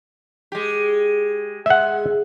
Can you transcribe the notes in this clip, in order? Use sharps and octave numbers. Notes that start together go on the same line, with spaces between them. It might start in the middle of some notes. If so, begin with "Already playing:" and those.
G#3 G4
G#3 E5 F#5